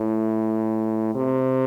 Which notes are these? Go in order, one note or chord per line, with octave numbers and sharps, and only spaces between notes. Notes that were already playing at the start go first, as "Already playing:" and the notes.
Already playing: A2
C3